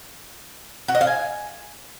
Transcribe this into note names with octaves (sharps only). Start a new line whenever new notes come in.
F#4
D#5
F5
G#5